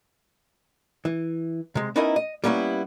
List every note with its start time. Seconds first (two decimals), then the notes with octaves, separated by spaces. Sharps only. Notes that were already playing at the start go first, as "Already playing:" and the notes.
1.05 E3
1.75 C3 G#3
1.96 B3 C#4 D#4 E4 A#4 D#5
2.16 D#5
2.44 G3 A#3 B3 C#4 E4